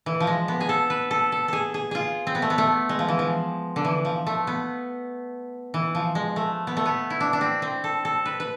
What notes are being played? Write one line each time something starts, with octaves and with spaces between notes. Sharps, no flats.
E3
F3
G#3
B3
G#4
A4
B4
A4
A4
G#4 A4
G#4
F4 G#4
C4
B3
A3
B3
A3
G#3
F3
E3
F3
D3
E3
F3
A3
B3
E3
F3
G#3
A3
B3
A3
B3
E4
D4
D4
C4
C4
A4
A4
B4
B4